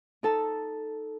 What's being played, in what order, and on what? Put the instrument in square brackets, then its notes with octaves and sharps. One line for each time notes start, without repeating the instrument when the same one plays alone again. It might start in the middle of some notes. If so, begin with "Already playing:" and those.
[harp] D#4 A4 A5